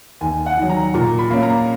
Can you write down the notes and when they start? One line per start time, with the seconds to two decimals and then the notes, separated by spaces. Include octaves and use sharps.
0.21 D#2 G#5
0.46 F#5
0.57 D#3
0.63 F#3
0.70 A#5
0.94 A#2 A#5
1.19 B5
1.30 A#3 C#4
1.43 A#5